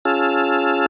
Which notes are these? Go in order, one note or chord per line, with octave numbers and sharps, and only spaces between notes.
C#4 F4 G#4 A5 E6 F6